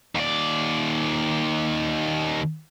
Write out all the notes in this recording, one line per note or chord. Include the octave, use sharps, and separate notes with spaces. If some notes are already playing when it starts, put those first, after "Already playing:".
D#2 D5